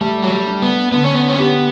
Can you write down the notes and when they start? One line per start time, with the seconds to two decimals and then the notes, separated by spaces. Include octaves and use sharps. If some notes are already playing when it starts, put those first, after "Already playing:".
0.01 G3 A3
0.22 F#3
0.31 G3
0.47 D4
0.62 B3
0.92 D3 B3
1.03 C#4
1.15 B3
1.28 C#4
1.39 B3 G4